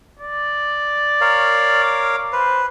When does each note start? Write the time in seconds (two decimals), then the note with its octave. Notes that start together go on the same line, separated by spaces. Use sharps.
0.19 D5
1.21 A#4 C#5 F5
1.83 D6
2.33 B4 C5